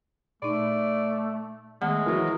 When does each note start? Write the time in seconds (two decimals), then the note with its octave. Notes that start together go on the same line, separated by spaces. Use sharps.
0.42 A#2 A3 D#4 D5
1.82 D#3 G#3 A3 B3 F#5
2.06 E3 F#3 A#4